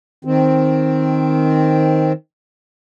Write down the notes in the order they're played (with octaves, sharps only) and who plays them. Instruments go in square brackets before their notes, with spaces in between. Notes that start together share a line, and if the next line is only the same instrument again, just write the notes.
[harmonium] D#3 C4